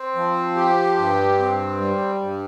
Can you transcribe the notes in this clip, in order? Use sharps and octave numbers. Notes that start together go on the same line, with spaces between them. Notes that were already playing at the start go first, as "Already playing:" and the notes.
Already playing: C4
F3
G4
G2
C4
G3
G2